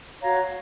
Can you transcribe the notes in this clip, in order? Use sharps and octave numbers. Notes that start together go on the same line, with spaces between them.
F#4 C#5 F5 A#5